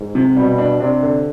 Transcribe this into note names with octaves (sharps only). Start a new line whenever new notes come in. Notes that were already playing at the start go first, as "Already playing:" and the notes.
Already playing: G#2
C3
B2 G3
D4
C3 D4
D3